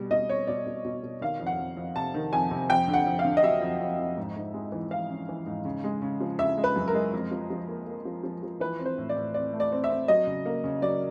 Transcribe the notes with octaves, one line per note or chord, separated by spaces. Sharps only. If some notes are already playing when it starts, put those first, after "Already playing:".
Already playing: B2 G3
B2 D#5
C4 C#5
B2 D5
B2
B2
B2
D#3 F5
F2
F#5
F2
F2
C3 A5
D#3
F2 G#5
C3
F2 G5
D3
F#5
F2
F5
D3
D#5
F#3 E5
F2
F2
F2
G#2
G#2
G#3
E3
E3 F5
C#4
E3
G#2
C#3
G#3
C#3
F3
C#3 E5
G#3
B4
F#2
A#4
G#3
F2
F3
F3
A#3
A#3
F3
F3
F3
E3 B4
C4
C5
A2
D5
A2
C4 D5
A3
D5
C4
E5
C4
F#3 D#5
C#3
A#3
C#3
F#3 D5